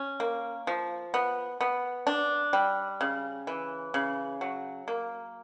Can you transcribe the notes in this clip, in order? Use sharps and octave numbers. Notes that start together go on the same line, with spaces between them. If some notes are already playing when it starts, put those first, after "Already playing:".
Already playing: C#4
A#3
F3
B3
B3
D4
G3
C#3
E3
C#3
F#3
A#3